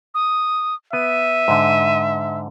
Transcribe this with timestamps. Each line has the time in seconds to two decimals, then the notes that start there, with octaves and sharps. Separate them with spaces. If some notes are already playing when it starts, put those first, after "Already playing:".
0.14 D#6
0.93 B3 E5 D#7
1.48 G#2 D3